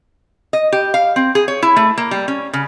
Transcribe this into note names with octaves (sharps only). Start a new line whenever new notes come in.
D#5
G4
F5
C4
G#4
C#5
E4
A3
A#3
G3
C#4
C#3